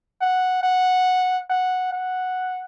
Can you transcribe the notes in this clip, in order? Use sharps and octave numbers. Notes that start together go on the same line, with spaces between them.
F#5
F#5
F#5
F#5